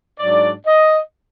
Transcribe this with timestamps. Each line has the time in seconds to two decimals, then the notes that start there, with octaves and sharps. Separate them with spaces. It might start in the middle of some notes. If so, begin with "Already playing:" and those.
0.19 G#2 F#3 D4 D5
0.66 D#5